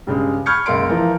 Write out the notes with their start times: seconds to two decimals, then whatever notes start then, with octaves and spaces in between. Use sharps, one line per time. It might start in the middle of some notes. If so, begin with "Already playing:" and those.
0.07 G2 C#3 G#3
0.46 B5 C#6 F6 G6 G#6 C#7
0.66 C#2 F#2 A#3 C6 D7
0.89 E3 F3 A#4